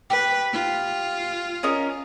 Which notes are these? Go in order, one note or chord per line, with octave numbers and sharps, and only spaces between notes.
G4 B4
F4
C#4 A#4 D#5